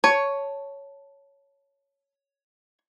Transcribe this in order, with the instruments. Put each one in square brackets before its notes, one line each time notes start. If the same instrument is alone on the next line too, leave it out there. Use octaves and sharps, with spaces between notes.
[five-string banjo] C#5 [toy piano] A5